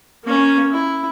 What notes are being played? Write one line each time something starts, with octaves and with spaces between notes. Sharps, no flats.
A#3 C#4
E4